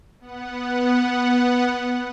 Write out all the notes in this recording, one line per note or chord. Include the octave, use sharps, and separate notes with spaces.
B3 F#5